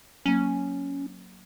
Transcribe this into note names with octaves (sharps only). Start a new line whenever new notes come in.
F#3 A#3 C#4